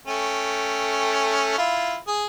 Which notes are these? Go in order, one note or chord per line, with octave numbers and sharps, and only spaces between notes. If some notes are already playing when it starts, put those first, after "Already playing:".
A3 C#4 G5
E4 F4
G#4